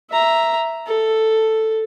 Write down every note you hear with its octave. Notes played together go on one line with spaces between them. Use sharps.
E5 A#5
A4